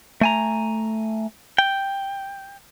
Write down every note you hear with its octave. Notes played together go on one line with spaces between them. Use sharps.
A3 G#5 A#5
G5